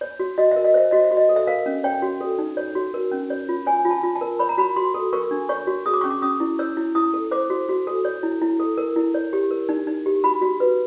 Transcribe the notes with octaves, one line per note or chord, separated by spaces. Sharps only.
C#5
F#4
F#4 D#5
A#4 E5
D#5
C5 E5
F#4 D#5
E5
F#4
D#5
A4
E5
A#4 F5
C#4
C#5 G5
F#4
A4
D#4
C#5
F#4
A#4
C#4
C#5
F4
C#5 G#5
F4
A5
F4
A5
A#4
C#5 B5
A#5
F#4 B5
F#4 C6
A4
A#4 C#6
D4
C#5 C#6
F#4
G#4 D#6
D6
C#4 C#6
D6
C#4 D#6
E4
C#5 E6
E4
E4 D#6
A4
C5 D6
F#4
F#4
A4
C#5
E4
E4
A4
A#4
E4
C#5
G4
A#4
D#4
D#4
G4
F#4 B5
F#4
B4